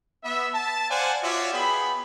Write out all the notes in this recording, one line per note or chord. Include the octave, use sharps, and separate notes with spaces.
B3 E5
A5
C5 D5 F5 F#5 G#5
F4 F#4 C#5 D5 E5
B3 G#4 G5 B5